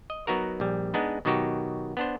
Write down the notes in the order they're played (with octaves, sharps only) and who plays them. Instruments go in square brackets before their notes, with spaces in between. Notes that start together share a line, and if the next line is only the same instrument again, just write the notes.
[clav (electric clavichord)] D#5
F#3 B3 D#4 F#4 A#4
A#1 G3
G#3 B3 D4 D#4
B2 D#3 F#3 D#4 F#4 G4
B3 D4 C5